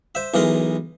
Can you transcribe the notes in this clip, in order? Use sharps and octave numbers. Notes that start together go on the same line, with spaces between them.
C5 E5
B1 E3 G#3 A#4 C6